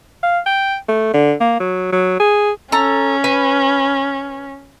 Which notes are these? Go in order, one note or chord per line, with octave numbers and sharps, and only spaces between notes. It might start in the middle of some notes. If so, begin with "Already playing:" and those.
F5
G5
A3
D3
A#3
F#3
F#3
G#4
C#4 A4 A#5
B4